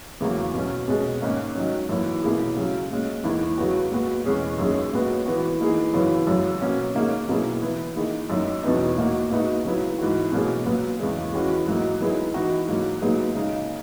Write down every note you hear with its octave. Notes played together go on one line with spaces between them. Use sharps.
E2 C#3 F#3 A#3
B2 F#3 C#4
B2 G#3 C#4 G#4
G#2 D#3 A#3 C#4
D#3 F#3 C#4
F#2 E3 A#3
B2 A#3 E4 G#4
C#3 F#3 C#4
A#2 G#3 C#4
E2 D#3 A#3 E4
C#3 F#3 B3 F#4
A#2 G#3 B3 F#4
E2 B2 G#3 C#4 G#4
F#2 D#3 A#3 C#4 G#4
A#2 G#3 B3 F#4
E3 B3 F#4
E3 A#3 D#4 G#4
F#2 C#3 E3 B3 F#4
F#2 C#3 F#3
B2 A#3 C#4 F#4
D#3 A#3 C#4 G#4
B2 F#3 A#3 E4 G#4
E3 B3 E4
D#3 A#3 E4 G#4
F#2 D#3 A#3 D#4
E2 B2 F#3 B3 D#4
A#2 A#3 D#4 F#4
A#2 G#3 B3 D#4 F#4
C#3 F#3 B3 E4
G#2 E3 B3 F#4
B2 F#3 A#3 C#4 G#4
A#2 F#3 B3
E2 C#3 G#3
E3 G#3 C#4 F#4
G#2 F#3 A#3 D#4
D#3 F#3 B3 E4 G#4
E3 B3 D#4 F#4
G#2 F#3 A#3
A#2 F#3 B3 D#4 G#4
C#3 G#3 D#4